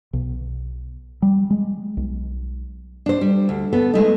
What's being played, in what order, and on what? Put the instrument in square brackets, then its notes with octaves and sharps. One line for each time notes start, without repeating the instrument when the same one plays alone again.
[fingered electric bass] B1
G3
G#3
B1
[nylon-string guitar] D4 C5
G3
D2
B3 A4
G#3 A3 D#4